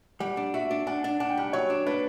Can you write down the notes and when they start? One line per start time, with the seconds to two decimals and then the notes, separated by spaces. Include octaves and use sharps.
0.20 G3 F#5
0.37 D4
0.54 F#4 E5
0.71 D4
0.87 D4 F#5
1.04 D4
1.20 D4 F#5
1.30 G5
1.37 G3 F#5
1.53 F#3 C#5
1.70 D4
1.86 D4 B4